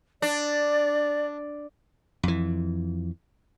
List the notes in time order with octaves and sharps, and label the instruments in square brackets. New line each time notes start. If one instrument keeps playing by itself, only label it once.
[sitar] D4 [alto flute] D5
[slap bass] F2 E3